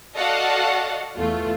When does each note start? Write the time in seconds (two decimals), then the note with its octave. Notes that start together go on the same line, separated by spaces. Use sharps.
0.17 F#4 A4 D5 D#5 F5 F#5
1.16 E2 A3 F4